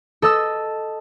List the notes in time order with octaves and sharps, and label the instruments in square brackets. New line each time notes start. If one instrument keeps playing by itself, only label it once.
[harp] A4 D#5 E6